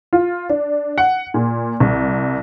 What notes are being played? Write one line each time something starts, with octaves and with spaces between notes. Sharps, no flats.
F4
D4
F#5
A#2
C2